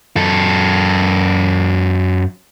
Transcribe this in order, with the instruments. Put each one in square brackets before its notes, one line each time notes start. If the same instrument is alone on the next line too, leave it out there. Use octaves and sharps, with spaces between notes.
[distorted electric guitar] F#2 A4